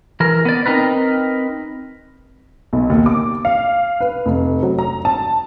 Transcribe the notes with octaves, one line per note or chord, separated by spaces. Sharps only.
E3 A#4
B3 D5
C4 D#4 A#4 B4
B1
D#2
D6
F5
B4
F1
F#3
A#5
A5